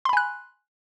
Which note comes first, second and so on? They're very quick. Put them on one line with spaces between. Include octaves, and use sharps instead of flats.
C6 B5 G#5 F#6